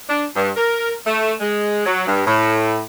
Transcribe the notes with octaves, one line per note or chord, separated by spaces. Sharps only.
D4
G2
A#4
A3
G#3
F#3
G2
A2